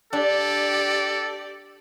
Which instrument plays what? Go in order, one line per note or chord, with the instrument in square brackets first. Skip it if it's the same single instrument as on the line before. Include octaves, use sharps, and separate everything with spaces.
[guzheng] D4 [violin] G4 D5 [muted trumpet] A4